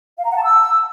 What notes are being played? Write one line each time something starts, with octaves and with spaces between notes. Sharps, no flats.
F5
A#5
F#5
A5
E6